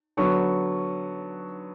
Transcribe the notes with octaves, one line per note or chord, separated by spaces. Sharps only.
D3 F#3 B3 C#6